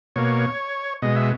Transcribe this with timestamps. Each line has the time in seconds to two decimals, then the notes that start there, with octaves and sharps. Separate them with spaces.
0.16 B2 A#3 C#5
1.02 B2 G#3 D#5
1.16 E5